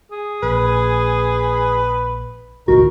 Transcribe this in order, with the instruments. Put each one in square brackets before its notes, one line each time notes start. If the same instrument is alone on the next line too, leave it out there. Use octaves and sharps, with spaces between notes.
[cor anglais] G#4
[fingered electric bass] A#1 [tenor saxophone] B4
[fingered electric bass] E1 A1 D2 [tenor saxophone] D#3 [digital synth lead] F#4 [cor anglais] A#4